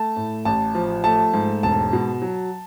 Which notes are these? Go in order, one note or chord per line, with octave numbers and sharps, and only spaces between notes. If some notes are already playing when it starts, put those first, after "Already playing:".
Already playing: A3 A5
A2
A1 A5
F3
A3 A5
G#2
E1 A5
B2
F#3